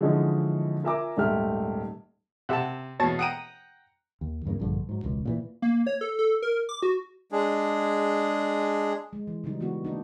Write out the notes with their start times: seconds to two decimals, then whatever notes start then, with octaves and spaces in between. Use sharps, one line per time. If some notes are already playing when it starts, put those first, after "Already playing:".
0.01 D3 E3 F3 G#3 C#4 D#4
0.83 F4 A#4 E5 G#5 A#5 D6
1.17 D#1 G#2 A3 G4 F6
2.49 C3 G4 E5 F#5 A5
3.00 E2 B2 C#5 A5 A6
3.19 F#5 G5 A#5 D#6 D7 D#7
4.21 D#2
4.45 E2 G2 C#3 A#3
4.60 A#1 G2 D3
4.89 G#2 F#3
5.04 E1 C#2
5.25 A#2 C#3 E3
5.62 A#3
5.87 C#5
6.01 A4
6.19 A4
6.42 A#4
6.69 D6
6.83 F#4
7.32 G#3 D4 G#4
9.13 G#3
9.27 E3
9.44 C#3 F#3 G3 D#4
9.60 E3 G#3 B3 F#4
9.85 A#3 D4 D#4